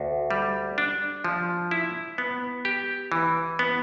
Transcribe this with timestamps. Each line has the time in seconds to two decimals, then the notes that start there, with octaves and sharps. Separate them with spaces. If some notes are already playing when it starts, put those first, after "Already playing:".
Already playing: D2
0.31 G3
0.78 D4
1.24 F3
1.71 E4
2.18 B3
2.65 G4
3.12 E3
3.59 B3